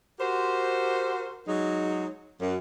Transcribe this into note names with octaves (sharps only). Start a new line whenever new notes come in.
F#4 G4 A#4 C5
F#3 G#3 D#4
F#2